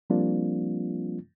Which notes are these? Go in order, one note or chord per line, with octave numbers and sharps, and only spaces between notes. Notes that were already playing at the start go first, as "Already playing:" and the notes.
F3 G3 A#3 C4 D4 F4